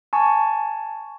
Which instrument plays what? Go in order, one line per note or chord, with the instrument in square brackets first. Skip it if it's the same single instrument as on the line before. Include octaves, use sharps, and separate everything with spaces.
[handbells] G#5 A5 C#6